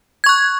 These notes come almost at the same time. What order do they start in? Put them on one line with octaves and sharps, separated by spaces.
G#6 C#6 F#6